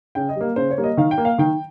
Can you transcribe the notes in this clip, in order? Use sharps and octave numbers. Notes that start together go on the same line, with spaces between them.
C#3 G5
D#5
G3 A#3
C#3 C5
C#5
G3 A#3
D#5
D#3 F5
G5
A#3
F5
D#3 G5